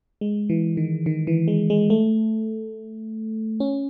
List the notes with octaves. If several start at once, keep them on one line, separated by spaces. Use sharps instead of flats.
G#3
E3
D#3
D#3
E3
G#3
G#3
A3
C#4